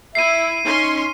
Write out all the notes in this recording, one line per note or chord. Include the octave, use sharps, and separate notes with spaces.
E4 E5 C7 D#7
C#4 D#4 C6